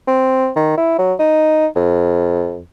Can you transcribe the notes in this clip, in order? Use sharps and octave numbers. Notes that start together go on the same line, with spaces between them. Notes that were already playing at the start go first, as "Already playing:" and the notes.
C4
D#3
E4
F#3
D#4
F2